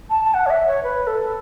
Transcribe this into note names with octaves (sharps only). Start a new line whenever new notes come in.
A5
A5
F#5
C#5
E5
C#5
B4
A4